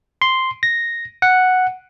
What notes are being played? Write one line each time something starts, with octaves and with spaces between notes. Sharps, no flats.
C6
A#6
F#5